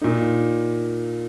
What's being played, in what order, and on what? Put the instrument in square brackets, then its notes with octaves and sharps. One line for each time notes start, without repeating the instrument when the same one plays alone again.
[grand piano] A#2 A#3 D#4